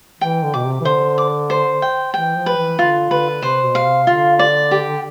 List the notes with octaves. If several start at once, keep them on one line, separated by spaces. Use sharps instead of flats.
E3 G5
D3
B2 D6
C3
E3
D3 C5
D6
C5
G5
E3 G5
F3
B4
E3
D3 F4
D3 B4
C3 C5
B2
F5
C3
D3 F4
D5
G4